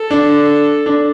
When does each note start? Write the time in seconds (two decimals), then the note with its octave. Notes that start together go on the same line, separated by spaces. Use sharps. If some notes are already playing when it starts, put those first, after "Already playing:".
Already playing: A4
0.11 D4
0.86 D4